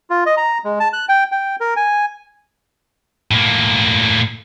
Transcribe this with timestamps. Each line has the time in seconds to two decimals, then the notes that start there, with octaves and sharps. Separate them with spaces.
0.10 F4
0.26 D#5
0.37 A#5
0.65 G#3
0.80 A5
0.93 F#6
1.09 G5
1.32 G5
1.61 A#4
1.76 G#5
3.31 A2 A#3